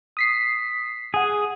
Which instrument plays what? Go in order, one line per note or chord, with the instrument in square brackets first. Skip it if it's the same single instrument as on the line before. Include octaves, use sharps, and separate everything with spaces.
[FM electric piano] D#6 B6 C7
[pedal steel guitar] G#4 [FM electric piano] F#5 G#5